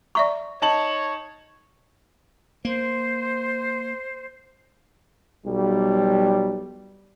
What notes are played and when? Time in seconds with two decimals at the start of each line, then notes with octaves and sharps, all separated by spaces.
0.15 D5 E5 A#5 C#6
0.62 D#4 C#5 A5 F#7
2.65 A#3 C5
5.46 B1 G3